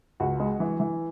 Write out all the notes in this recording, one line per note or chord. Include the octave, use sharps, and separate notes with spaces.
C#2 F#4
G#3
E3
E3